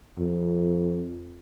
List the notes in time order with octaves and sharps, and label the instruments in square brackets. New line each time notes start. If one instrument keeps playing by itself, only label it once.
[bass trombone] F2